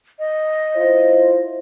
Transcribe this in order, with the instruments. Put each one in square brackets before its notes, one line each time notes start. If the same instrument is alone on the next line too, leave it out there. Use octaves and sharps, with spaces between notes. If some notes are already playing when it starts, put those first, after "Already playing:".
[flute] D#5
[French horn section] E4 F4 C5